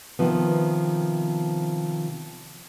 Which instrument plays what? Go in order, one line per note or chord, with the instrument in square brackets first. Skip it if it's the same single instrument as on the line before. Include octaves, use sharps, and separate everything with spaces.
[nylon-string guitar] C3 D#3 F3 B3